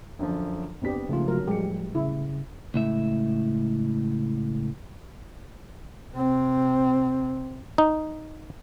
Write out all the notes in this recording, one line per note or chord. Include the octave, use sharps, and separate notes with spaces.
F#2 D3 F3 D4
F#1 B3 C4 D4 G4 B6
G#2 C#3 F3 A3 A#3 F4
F#3 C#4 A#4
A1 F3 G3 G#3 G4 C#7
C#3 E4
C#2 A2 E5
C3 C4
D#4